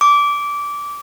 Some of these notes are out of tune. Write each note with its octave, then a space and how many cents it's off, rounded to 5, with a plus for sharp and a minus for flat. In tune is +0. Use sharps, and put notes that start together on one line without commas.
D6 -15